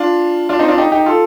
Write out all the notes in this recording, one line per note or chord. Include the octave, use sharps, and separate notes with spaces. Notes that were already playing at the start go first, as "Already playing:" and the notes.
Already playing: D4 F4
D4 F4
C4 D#4
D4 F4
D#4 G4
D#4 G4
F4 A4